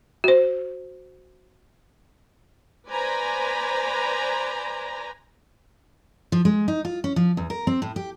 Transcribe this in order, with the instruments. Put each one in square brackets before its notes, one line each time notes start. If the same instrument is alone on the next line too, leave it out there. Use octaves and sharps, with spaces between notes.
[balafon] F#4 C5
[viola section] B4 C5 D5 G#5 A#5 B5
[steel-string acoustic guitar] F3
G#3
D#4
F4
C#4
F3
E2
A#4
C4
A2
G4